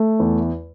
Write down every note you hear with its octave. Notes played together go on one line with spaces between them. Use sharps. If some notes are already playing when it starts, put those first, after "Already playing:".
Already playing: A3
E2